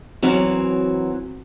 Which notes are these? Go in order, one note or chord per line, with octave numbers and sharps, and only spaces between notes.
F#2 E3 F#3 C4